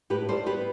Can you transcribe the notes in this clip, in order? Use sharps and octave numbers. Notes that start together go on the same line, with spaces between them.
A2 G4 B4
G3 A4 C5
B3 G4 B4